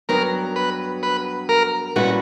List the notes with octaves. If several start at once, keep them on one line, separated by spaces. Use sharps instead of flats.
G2 F#3 B3 A#4
B4
B4
A#4
A#2 G3 C#4 E4 F#4 B4